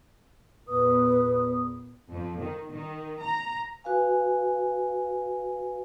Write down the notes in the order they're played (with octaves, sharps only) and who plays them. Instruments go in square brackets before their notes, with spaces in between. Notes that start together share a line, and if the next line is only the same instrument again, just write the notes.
[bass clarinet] E2 [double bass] A#2 B3 [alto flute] B4 [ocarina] D#6
[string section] F2
D#3
D#3
A#5
[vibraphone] F#4 B4 F5 G#5